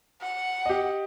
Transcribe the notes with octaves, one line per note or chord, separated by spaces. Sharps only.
F#5
G4 D#5